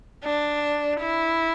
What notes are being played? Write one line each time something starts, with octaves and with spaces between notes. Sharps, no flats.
D4
E4